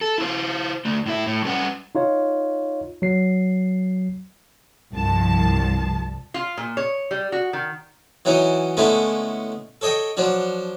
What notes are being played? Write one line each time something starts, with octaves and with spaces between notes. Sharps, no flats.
A4
E4 F4 A#4 C5
D3 A3
A2 E4 E5
A2
G3 C#4 B4 F#5
D#4 F4 C#5
F#3 C7
C2 G2 F3 A5
F4
A#2
C#5
G3
F#4
D#3
E3 F#3 C#4 D#4
D3 G#3 A3 B3 C#4 E4
A4 C#5 D#5 G5
F3 F#3 D4